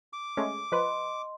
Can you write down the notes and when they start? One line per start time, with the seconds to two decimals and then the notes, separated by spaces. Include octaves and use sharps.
0.13 D6
0.37 G#3 A3 C#4
0.72 F3 B4 D#5 C6